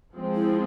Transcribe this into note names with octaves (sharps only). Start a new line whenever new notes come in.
F3 G#3 C4
E4